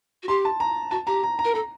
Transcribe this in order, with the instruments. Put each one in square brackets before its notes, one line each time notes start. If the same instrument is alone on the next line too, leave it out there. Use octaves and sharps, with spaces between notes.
[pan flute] F#4
[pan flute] G4 [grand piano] C6
[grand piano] A5
A#5
[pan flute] F#4 [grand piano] A5
[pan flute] G4 [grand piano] A#5
[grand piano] A#5
A#5
[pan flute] A#4
[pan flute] A4 [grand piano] A#5